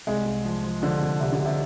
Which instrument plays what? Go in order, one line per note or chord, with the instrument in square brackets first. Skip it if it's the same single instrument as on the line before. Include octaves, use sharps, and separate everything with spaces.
[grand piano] C2 [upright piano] G#3
[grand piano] C2
F3
F3
[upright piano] D3 [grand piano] F3
[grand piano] C2
[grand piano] C2 [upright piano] C3
[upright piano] D3
[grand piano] C2 [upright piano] C3